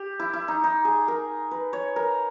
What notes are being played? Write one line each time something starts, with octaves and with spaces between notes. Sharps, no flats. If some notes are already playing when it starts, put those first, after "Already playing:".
Already playing: G4
E4
E4
D#4
D#4
G#4
A#4
B4
C#5
A#4